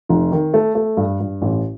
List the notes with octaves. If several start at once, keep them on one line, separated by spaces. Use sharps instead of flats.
F1
D#3
A3
A3
G2
G2
A1